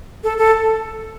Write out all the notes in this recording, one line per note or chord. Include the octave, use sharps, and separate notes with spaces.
A4
A4